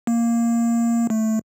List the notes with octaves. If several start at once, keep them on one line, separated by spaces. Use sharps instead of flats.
A#3
A3